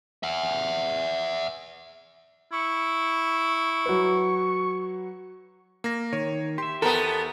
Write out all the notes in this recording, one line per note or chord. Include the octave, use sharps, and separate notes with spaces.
E5 F#5
E4 C#6
F#3 B4
A#3 A#6
D#3 C#5
G4 E5 C6
E2 B3 A4 A#4